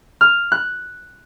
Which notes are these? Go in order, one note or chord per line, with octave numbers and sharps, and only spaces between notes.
F6
F#6